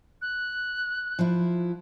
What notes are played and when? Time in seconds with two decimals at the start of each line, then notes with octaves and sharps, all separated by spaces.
0.22 F#6
1.19 F3 E4